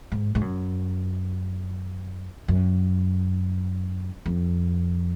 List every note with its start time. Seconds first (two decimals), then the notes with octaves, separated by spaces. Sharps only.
0.12 G#2
0.35 G#2
0.41 F#2
2.48 F#2
4.26 F2